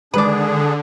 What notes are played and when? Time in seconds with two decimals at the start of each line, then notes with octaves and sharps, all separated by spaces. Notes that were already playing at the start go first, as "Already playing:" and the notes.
0.14 D3 D#3 G#3 D4 G#4 B4 D5